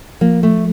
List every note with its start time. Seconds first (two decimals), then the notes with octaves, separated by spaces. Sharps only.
0.21 F3 A#3
0.43 A3